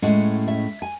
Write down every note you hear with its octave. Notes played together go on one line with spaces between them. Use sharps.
A2 G#3 C#4 F#5
E5
G#5